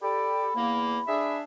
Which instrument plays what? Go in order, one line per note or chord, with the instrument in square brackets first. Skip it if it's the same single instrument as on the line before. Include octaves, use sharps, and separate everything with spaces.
[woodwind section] G4 A4 D5 [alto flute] B5
[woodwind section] E2 A#3
D4 G#4 E5